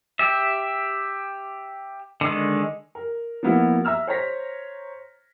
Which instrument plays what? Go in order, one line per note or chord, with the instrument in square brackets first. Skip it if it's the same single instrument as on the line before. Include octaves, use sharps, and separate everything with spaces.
[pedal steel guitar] G4 E5
D3 D#3 G#3
[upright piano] A#4
F3 A#3 B3 E4 F#4
E5 A#5 E6 F6
C5 C#5 A#5 A#6 B6